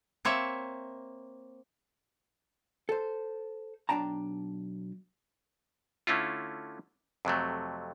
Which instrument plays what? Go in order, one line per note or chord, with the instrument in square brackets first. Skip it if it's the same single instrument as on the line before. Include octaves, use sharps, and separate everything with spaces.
[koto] A#3 C4 C#5 E5
[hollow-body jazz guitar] A4 C5
B1 G2 D4 G5 A5 A#5
[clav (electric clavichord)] D3 A3 C#4 E4 F4
F2 C3 F#3 A3